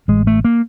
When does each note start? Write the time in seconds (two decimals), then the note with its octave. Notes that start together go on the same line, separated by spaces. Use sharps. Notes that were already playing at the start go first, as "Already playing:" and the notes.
0.08 A1 G#3
0.27 A3
0.45 A#3